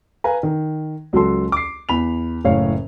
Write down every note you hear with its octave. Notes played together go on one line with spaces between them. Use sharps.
B4 F5 G#5 A#5
D#3
C#2 F#3 F#4 A4 C6
D6 C7
E2 B5 F7
F#1 A2 C#5 F5